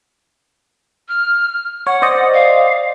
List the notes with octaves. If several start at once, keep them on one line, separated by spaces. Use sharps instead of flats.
F6
C#5 F#5
C5 D5 D#5
F5